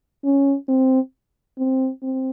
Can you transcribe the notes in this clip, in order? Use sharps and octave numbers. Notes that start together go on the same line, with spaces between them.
C#4
C4
C4
C4